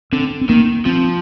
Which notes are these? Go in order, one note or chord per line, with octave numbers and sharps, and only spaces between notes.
D3 C4
C4
D#3 A#3
F3 C4